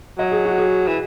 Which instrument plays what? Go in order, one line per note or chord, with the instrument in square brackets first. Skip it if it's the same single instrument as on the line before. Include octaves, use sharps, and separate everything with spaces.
[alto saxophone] F#3 [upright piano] D#5
[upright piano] G#4
F#4
G#4
[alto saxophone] E3